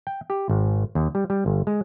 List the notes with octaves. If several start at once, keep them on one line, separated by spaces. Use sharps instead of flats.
G5
G4
G#1
D#2
G3
G3
G1
G#3